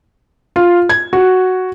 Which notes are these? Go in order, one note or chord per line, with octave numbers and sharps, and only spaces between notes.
F4
G#6
F#4